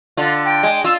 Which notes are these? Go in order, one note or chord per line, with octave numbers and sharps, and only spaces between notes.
D3 F4
G5
G#3
F4 E6